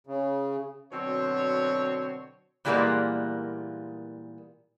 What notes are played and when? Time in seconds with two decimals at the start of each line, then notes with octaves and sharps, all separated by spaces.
0.07 C#3
0.92 B2 D3 F#3 C4 C#5
2.65 A#2 E3 G3 G#3 A#3 B3